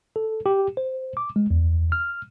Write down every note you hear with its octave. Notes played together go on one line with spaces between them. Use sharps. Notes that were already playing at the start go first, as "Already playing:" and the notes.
A4
G4
C5
D6
G#3
E2
F6